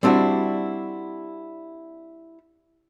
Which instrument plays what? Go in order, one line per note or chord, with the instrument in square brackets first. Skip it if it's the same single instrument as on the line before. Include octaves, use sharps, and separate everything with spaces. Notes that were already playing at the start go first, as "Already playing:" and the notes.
[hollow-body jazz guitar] G3 C4 D4 E4 F#4